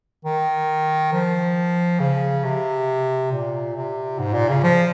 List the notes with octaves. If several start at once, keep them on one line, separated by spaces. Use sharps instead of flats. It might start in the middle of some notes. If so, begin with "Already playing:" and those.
D#3
F3
C#3
C3
A#2
C3
G#2
A#2
C#3
F3